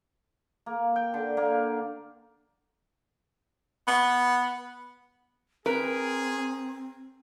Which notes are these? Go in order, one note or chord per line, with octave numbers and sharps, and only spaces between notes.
A#3
G5
D3
A#3
B3
C4 G#4 A#4 B4